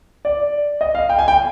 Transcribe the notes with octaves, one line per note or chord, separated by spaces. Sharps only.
D5
D#5
F5
G5
G#5
G5